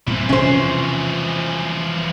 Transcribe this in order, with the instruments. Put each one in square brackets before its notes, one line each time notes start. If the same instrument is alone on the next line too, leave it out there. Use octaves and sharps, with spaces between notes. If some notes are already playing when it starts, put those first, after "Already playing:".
[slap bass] A#2 G3 C4 [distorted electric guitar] E3 F3
[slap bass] E1 C3 [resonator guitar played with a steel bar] C#4 C5